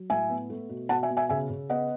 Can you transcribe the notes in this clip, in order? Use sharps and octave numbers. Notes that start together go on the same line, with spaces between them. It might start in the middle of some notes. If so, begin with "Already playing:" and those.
Already playing: F#3
A2 E5 G#5
B3
A3
B2
B2 F#5 A5
E5 G#5
B2
E5 G#5
C#3 E5 G#5
C#3
B3 D#5 F#5